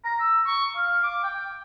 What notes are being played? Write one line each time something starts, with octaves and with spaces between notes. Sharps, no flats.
A#5
E6
C#6
F5
D6
G5